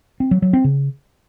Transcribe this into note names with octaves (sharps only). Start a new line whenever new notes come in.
C4
F#3
F#3
C4
C#3